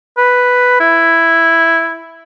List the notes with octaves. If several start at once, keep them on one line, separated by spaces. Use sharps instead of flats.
B4
E4